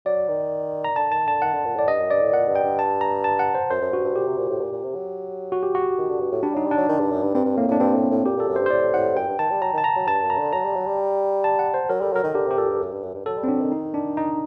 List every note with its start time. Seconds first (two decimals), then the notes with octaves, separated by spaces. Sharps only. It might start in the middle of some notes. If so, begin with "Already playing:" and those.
0.06 F#3 D5
0.29 D#3
0.84 A#5
0.96 D3 A5
1.12 D#3 A5
1.28 D3 A5
1.42 D#3 F#5
1.54 D3
1.65 A#2
1.76 A2 D5
1.88 G2 D#5
1.99 F#2
2.10 G2 D5
2.22 A2
2.33 A#2 F#5
2.49 G2
2.56 G5
2.63 G2
2.79 A5
3.01 A#5
3.24 A5
3.39 F#5
3.55 C5
3.70 F#2 C5
3.82 F#2
3.93 G2 F#4
4.04 G2
4.15 A#2 G4
4.27 C3
4.38 A#2
4.50 A2
4.61 A#2
4.72 A#2
4.83 C3
4.95 F#3
5.52 F#4
5.63 G4
5.75 F#4
5.98 D#3
6.09 D3
6.20 G2
6.32 A2
6.43 G3 D4
6.55 F#3 D#4
6.66 G3
6.71 D4
6.77 F#3
6.89 D#3
7.00 G2
7.11 F#2
7.23 G2
7.34 G2 C4
7.45 G2
7.57 A2 A#3
7.68 A2 D4
7.79 G2 C4
7.95 A2
8.10 A2
8.25 A#2 G4
8.37 A#2 A4
8.48 F#2
8.56 C5
8.60 G2
8.66 C5
8.71 A2 D5
8.94 A2 F#5
9.16 F#2 G5
9.28 G2
9.39 D#3 A5
9.51 G3
9.62 F#3 A#5
9.73 D#3 A5
9.84 A#5
9.96 F#3
10.08 G2 A5
10.23 F#2
10.30 A#5
10.38 D3
10.53 F#3 A#5
10.65 G3
10.76 F#3
10.87 G3
11.44 A5
11.59 F#5
11.74 C5
11.89 F#3 A#4
12.01 G3 A4
12.13 F#3 A#4
12.24 D#3
12.35 D3 G4
12.47 C3 G4
12.58 A#2 A4
12.69 G2
12.81 F#2
12.92 G2
13.03 F#2
13.14 G2
13.26 F#3 A4
13.38 G3
13.44 C4
13.48 F#3 D4
13.60 D#3
13.72 D#4
13.94 D4
14.17 D#4